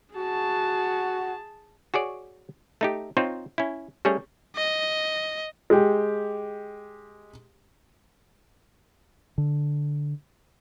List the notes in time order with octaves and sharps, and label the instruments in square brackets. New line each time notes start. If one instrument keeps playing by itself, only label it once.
[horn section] F#4 [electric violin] G#4 A5
[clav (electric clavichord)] F#4 G#4 C#5 D5
A3 D#4 G4
C4 D#4 F4 C5 C#5
C#4 E4
G3 A3 C#4 G#4 C#5
[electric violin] D#5
[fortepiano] G#3 G4
[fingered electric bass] D3